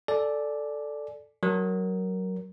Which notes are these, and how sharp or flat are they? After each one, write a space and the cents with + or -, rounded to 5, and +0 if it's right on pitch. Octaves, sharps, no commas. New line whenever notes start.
A4 +0 D5 +0 G#5 +25
F#3 +15 A#4 +0